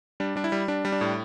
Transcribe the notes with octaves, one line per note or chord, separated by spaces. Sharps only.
G3 D4
G3 D4
E4
G3
G3 D4
G3
D4
A2